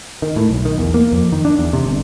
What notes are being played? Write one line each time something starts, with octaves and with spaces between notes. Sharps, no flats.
D#3
A2
B1
D#3
E2
A#3
F2
D#3
D4
E2
C3
G1